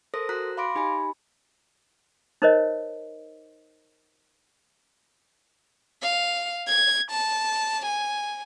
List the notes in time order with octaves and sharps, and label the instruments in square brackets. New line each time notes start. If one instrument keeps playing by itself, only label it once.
[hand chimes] A4 A#4 C5 D#6 A#6
F#4 A#5 F#6 B6
F5 B5 C6 D6 A#6 D7
D#4 G4 G#5 B5
[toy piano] D#4 A#4 C5 C#5 D#5
[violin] F5
G#6
A5
G#5